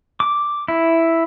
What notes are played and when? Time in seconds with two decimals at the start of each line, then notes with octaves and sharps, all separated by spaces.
0.20 D6
0.68 E4